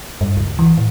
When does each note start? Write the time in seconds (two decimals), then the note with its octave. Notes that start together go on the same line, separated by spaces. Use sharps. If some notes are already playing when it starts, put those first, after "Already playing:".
0.21 G2
0.37 C#2
0.59 E3
0.77 A2